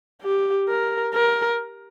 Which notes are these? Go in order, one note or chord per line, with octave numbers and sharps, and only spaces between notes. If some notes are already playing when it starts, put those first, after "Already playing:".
G4
A#4
A#4